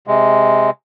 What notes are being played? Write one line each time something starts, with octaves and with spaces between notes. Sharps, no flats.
C3 G#3